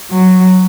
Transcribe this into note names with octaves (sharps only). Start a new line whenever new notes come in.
F#3